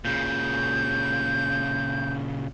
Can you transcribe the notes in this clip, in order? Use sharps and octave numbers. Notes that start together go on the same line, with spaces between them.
A#2 C#3 G6